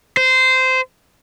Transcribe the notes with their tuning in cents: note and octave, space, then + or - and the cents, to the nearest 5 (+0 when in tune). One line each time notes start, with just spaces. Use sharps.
C5 -15